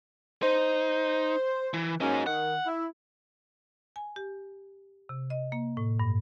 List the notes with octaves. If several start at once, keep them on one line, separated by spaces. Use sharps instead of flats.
D#4 C5
E3
F#3 A#3 C#4 D#4 G#4
D#3 F#5
E4
G#5
G4
C3
D#5
A#3
A2
G2